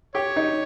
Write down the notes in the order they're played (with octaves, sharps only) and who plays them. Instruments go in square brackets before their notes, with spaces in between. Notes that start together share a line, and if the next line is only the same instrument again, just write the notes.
[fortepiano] G4 [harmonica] C#5
[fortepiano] D#4